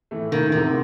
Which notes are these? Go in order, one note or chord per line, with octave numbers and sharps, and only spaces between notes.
A2 E3 A3
D#3
E2 C3 D#3 E3 G#3 C4